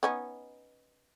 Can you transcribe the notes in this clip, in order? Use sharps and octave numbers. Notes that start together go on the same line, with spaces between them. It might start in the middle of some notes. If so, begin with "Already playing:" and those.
B3 C#4 D#4